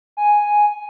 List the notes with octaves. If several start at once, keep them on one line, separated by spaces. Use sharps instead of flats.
G#5